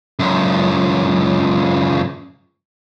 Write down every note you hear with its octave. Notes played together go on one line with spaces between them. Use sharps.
C#2 F#2